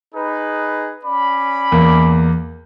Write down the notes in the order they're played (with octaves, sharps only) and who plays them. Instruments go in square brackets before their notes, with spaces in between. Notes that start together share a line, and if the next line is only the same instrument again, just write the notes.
[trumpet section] D#4 G#4 B4
C#4 D5 B5
[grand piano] E2 A#3